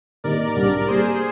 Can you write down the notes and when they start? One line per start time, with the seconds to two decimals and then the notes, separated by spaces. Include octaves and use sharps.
0.24 C3 D#3 A#3 D#4 A#4 D5
0.56 C2 C3 G3 D4 A#4 D5
0.88 C3 G3 A#3 G#4 C5